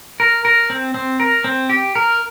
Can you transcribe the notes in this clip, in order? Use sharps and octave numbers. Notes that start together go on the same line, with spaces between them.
A#4
A#4
C4
C4
A#4
C4
G4
A#4